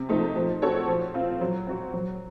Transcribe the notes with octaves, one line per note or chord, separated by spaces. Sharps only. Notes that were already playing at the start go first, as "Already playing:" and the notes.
Already playing: C3
F3 A3 D#4
F3
C4 F#4 A4 C#5
F3
C4 F4
F#3
C4 F#4 C5
F#3